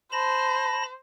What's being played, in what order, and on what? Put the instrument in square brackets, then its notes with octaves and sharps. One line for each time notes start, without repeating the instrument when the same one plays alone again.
[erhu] C5 [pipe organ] A5 B5 A#6